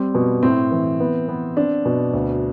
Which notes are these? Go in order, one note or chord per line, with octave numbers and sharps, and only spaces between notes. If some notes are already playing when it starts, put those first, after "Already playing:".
Already playing: G3 C4
B2
A2 C4
E3
B3
B3
C4 D4
B2
D2